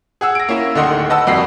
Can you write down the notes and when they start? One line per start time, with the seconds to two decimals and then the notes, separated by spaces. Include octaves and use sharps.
0.21 G#4 F#5 E6
0.35 A#6 D7
0.49 A#3 C#4 E4
0.75 D1 D3 D#3 D#5 F#5 C6
1.10 B4 D#5 F#5 A5 D#6 E6
1.27 C2 F2 F#4 D#5 B5 C7